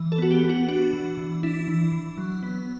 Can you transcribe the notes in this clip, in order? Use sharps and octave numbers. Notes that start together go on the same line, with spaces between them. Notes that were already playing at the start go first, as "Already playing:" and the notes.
Already playing: E3
A4
B3 F#4
G4
B3
F#4
D4 F#4
E3
E3
D4 E4
E3
E3
F#3
B3